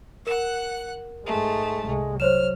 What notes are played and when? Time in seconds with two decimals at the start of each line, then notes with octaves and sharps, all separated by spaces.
0.27 A#4 F#5 F#6 E7
1.26 G#2 G#3 A3
1.85 C2 G#3
2.20 F#3 C5 C#5 F6 E7